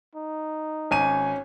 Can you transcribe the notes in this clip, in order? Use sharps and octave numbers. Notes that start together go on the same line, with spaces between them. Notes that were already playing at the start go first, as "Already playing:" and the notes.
D#4
G#1 C#4 G#5 D#7